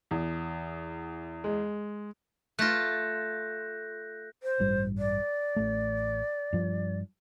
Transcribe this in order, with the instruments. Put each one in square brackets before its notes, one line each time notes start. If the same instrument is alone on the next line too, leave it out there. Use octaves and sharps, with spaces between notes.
[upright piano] E2
[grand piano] G#3
[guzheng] A3 F4 [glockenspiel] F#6 G6 A#6
[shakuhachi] C5
[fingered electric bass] A1 G2 G3
[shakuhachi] D5
[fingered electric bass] A1 A3
G2 F3